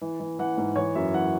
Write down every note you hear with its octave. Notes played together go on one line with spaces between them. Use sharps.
E3
E3
E3 F#5
G#2
E3 C#5
F#2 E5
E3 F#5